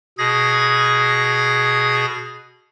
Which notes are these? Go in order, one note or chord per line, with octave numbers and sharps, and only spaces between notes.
B2 G#4 G#6 A#6